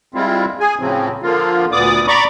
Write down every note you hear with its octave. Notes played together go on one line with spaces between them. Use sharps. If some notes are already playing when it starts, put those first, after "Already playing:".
G3 G#3 C4 E4 F4
G#4 G#5
A2 C#3 F3 F#3 C4
D3 F3 A#3 F4
D2 A#2 B3 D5 D6 D#6
D5 A#5 B5 C#6 D6